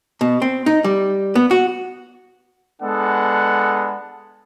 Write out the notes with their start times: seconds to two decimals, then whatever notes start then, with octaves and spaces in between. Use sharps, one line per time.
0.21 B2
0.42 C4
0.66 D#4
0.84 G3
1.35 B3
1.51 F#4
2.81 G#3 B3 D4 A4 F#5